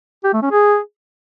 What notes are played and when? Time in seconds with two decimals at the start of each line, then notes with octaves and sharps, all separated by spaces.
0.24 G4
0.33 A3
0.42 C#4
0.52 G#4